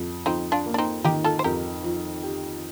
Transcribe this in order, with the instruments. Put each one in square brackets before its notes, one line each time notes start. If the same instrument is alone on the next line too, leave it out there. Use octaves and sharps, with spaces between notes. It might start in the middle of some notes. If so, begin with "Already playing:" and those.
Already playing: [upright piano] F2
[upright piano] F2 [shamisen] C4 D#4
[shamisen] D4 F4
[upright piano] A#3
[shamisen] D4
C4 D#4
[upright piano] D#3 [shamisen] D#4 G4
[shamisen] F4 A4
C5
[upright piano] F2 [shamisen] G4 A#4
[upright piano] F3
G4